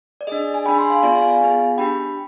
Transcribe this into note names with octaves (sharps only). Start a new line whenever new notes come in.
D5
D4 G#4 D#5
G#5
D4 G#4 G5 B5
G#5 C6
F5 G#5
B3 F4 G#4 D5 F5
F5 G#5
F5 G#5
B3 F4 G#4
D4 G4 G5 B5